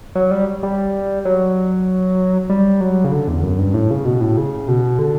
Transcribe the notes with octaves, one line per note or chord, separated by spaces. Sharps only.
F#3
G3
G3
F#3
G3
F#3
C#3
D3
E2
F#2
G2
A2
C#3
B2
A2
C#3
B2
D3